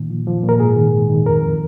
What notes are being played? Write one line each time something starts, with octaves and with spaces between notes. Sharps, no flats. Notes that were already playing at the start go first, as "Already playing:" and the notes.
Already playing: A#2 D#3
F3
F3
A#2
A#4
G#2 G#4
D#3
G#2
D#3
F2 A#4
F2